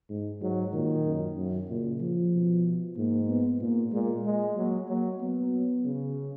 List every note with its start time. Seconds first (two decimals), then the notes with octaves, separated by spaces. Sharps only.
0.10 G#2
0.42 G#2 F#3
0.73 A#2 D#3
1.05 F#2
1.37 F#2
1.69 A#2 C#3
2.01 F3
2.33 B2
2.97 G#2 A#3
3.29 B3
3.61 A#2 A#3
3.93 A#2 G#3
4.25 G#3 A#3
4.56 F#3 A#3
4.89 F#3 A#3
5.20 F#3 B3
5.85 C#3